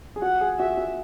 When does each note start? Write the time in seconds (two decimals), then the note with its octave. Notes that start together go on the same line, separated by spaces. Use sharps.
0.16 G#4
0.22 F#4 F#5
0.41 G#4
0.60 F#4 E5
0.78 F#4